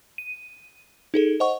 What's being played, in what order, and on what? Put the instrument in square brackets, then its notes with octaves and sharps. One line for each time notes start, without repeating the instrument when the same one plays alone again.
[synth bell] D#7
D#4 G#4 A4
C5 D#5 F#5 C#6